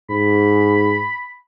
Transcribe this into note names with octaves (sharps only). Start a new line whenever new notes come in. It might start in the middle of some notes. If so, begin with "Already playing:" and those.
G#2 B5